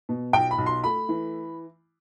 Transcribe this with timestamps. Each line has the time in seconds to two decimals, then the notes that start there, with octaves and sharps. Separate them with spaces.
0.09 B2
0.33 B1 G5
0.51 B5
0.58 B1
0.66 C6
0.84 A3 B5
1.09 E3